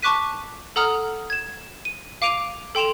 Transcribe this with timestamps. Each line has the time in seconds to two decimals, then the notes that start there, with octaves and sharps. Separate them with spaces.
0.02 A5 C#6 D6 F#6 B6 D#7
0.76 A4 F#5 A#5 D#6 F6
1.30 G#6 E7
1.85 D#7
2.22 F5 D6 D7 D#7 F7
2.75 A4 G5 C6 E7 F7